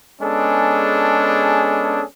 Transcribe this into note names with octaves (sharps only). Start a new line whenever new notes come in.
G#3 B3 C#4 D4 G#4 A4